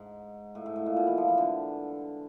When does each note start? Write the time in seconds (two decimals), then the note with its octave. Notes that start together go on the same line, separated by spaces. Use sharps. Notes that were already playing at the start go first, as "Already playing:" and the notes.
Already playing: G#2
0.55 A2
0.66 G#2
0.76 A2
0.86 A#2
0.97 B2
1.07 E3
1.17 F3
1.28 E3
1.38 D3